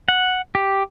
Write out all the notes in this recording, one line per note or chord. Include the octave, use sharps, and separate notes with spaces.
F#5
G4